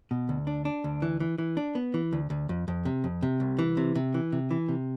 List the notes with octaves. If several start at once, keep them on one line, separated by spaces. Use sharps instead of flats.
B2
D2
D4
D4
D2
E3
E3
E3
D4
B3
E3
D2
D2
F2
F2
C3
F2
C3
C2
E3
C3
C3
E3
C3
E3
C3